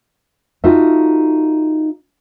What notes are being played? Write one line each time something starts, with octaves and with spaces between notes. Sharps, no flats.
D#4 F4 F#4 A4 E5